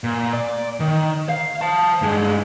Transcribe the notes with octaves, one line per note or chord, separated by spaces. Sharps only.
A#2
D5
D#3
F5
C5 A5
G2 G#3